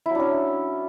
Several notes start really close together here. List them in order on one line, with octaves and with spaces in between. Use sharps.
E4 F#3 D4 C#4